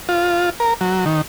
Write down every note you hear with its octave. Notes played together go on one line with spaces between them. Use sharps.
F4
A#4
F#3
D#3